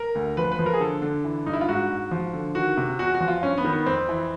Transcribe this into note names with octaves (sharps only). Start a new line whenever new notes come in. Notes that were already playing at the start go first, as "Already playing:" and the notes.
Already playing: A#4
D2
F3 B4
B4
F3
A#4
G#4
D3 A4
D3
E3
G2 D#4
E4
F4
G#2 F#4
G#2
F3
D3
D#3 F#4
C3
E2 F#4
F#4
F3
F4
G2 C#4
B3
D#3
B3
F2 C4
E3